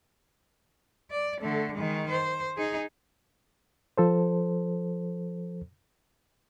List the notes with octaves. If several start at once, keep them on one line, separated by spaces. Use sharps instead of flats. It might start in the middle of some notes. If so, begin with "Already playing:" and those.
D5
D3 A3
D#3 G#3
C5
D#4 G#4
F3 A4 C5